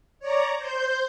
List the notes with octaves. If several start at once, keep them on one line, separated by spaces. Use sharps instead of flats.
C#5 D5 A#5
C5 G6